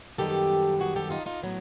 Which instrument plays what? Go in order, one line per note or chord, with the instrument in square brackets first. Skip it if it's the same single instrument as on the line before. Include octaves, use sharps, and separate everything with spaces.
[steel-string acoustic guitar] F#2 D#3 G3 B3 G4 A4
F#4 G#4
G4 A4
D#4 F4
D#4 F4
A2 F#3 B3